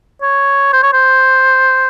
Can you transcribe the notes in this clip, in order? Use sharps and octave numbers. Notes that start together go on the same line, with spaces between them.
C#5
C5
C#5
C5